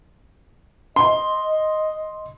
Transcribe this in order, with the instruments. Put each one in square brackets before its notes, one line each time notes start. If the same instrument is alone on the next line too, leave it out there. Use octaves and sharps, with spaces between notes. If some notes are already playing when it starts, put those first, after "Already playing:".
[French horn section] D#5 [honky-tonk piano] C6